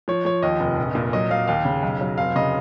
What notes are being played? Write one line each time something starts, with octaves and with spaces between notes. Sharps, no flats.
F3 C#5
F3 C#5
D#2 D#5
F1
A#1
A#2
F#3 D#5
F#3 F5
D#2 F5
C#3
B1
F#3
F1 F5
C#3 D#5